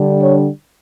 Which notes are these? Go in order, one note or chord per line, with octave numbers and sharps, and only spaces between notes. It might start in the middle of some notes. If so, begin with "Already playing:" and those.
Already playing: D3 G3 D4
C#5